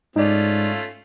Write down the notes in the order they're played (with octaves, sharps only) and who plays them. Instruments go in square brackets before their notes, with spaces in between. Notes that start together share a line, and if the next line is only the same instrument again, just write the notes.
[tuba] G#2 [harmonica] A3 C#4 F4 [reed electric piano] D#4 D5